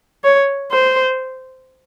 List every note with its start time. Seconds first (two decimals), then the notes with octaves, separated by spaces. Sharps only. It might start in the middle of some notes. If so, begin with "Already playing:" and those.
0.24 C#5
0.71 C5